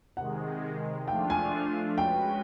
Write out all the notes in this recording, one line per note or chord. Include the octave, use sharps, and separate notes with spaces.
C3 D#3 G#3 F#5
F3 A3 D4 F4 G5
G#5
G#3 C#4 F#4 B4 G5